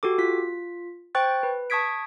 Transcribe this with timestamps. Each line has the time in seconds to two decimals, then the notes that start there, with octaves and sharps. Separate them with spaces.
0.03 F#4 G4 A4 D6
0.18 F4 B6
1.15 C5 G5 C#6 F#6 A6
1.43 B4
1.70 A5 C#6 D#6 G#6 B6 D7